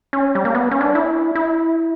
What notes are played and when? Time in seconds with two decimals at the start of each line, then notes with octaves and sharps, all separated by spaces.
0.13 C#4
0.35 G3
0.45 A#3
0.55 B3
0.71 C#4
0.81 D4
0.95 E4
1.35 E4